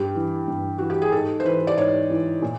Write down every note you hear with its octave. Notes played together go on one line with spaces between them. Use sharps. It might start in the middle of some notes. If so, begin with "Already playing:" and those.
Already playing: G2 G4
E3
G2
E3 F#4
G4
G#4
G#2 A4
C5
E3 B4
D5
G#2 C#5
E3
A#2